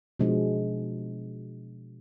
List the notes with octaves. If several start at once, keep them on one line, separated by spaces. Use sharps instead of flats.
B2 F3 G#3 D4